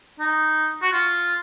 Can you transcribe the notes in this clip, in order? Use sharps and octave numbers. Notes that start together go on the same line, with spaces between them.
D#4
F#4
F4